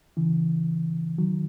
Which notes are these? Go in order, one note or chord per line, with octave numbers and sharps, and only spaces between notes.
C#3 E3
D#3 F#3